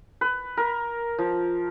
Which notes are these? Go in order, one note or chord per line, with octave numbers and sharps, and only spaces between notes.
B4
A#4
F3